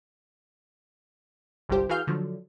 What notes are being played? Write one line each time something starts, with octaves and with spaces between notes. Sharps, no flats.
G1 C2 G2 G4 C5
E3 F#4 G#4 F5 F6 G6
D3 F3 F#3